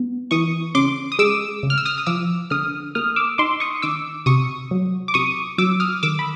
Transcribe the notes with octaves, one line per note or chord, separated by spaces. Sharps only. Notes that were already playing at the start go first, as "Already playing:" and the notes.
Already playing: B3
E3 C#6 D#6
C#3 C6 D6
D#6
G#3 D6 E6
C#3
F6
E6
D#6 F6
D#6
F3 D6 E6
D3 D#6 F6
A#3 D#6 F6
D6 E6
D#4 C6 D6
C#6 D#6
D#3 D6 E6
C3 C#6 D#6
F#3
D6
C3 C#6 D#6
F#3 D6 E6
D#6 F6
D#3 D6 E6
B5